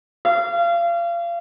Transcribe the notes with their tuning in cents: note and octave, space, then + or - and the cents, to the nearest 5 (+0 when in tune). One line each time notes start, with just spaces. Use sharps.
F5 -30